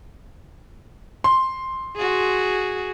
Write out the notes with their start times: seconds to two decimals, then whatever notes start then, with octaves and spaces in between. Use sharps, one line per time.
1.24 C6
1.96 F#4 G#4